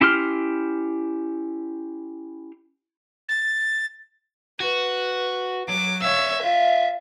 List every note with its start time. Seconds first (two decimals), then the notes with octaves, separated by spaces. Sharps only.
0.01 C#4 E4 G4 C6 F6
3.28 A6
4.60 F#4 B4
5.69 F#3 D6
6.02 C#5 E5 F5 E6
6.42 F4